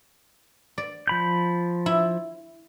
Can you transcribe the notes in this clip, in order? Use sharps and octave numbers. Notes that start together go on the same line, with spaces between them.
D5
F3 B5 G6
E4